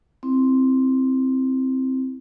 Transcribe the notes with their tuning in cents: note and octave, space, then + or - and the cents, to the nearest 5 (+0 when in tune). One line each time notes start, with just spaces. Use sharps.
C4 +0 E4 +0